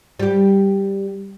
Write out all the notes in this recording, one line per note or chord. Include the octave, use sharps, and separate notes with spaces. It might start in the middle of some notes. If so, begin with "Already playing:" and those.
G3 G4